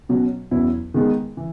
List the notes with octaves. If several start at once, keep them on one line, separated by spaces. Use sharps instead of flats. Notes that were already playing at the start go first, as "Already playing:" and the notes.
B2 F#3 C#4
E2 B2 F#3 C#4 E4
D#3 G#3 B3 D#4 G#4
E3